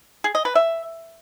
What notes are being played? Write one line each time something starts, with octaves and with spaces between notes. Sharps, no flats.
G#4
D#5
B4
E5